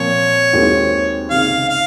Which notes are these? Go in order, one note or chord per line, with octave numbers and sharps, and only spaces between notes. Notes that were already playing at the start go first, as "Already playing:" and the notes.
Already playing: A#2 F3 C4 C#5
D#2 D#3 G#3 C4 F#4
C#2 C3 D#3 F5
F5